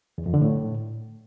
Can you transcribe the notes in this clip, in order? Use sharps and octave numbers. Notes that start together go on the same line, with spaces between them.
E2
F2
D3
A2